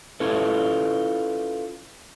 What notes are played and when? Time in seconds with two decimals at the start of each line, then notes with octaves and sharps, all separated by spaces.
0.20 C#4 E4 F4 A4 B4